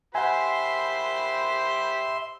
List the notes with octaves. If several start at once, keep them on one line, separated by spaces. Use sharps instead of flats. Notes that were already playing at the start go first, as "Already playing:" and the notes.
G4 C5 E5 F#5 G#5 B5 C6